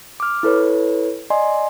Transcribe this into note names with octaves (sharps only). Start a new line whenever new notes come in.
D6 F6
E4 A4 B4 C#5
D5 D#5 G#5 C6